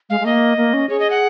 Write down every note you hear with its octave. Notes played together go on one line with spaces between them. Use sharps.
G#3 F5
G#3
A#3 D#5
A#3
C#4
G#4 C#5
D#5
F#5